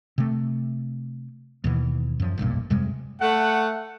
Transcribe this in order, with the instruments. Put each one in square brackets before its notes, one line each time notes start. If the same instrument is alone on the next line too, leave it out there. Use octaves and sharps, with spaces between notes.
[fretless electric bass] C3 A3
D#2 B2 E3
F#2 F3
F1 B1 G2 A#2
F2 C3 G3 G#3
[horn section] A3 F#5